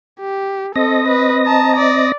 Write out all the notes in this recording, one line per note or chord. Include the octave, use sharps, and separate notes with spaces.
G4
C4 A4 D#5 A#6
B4
A5 A#5
D5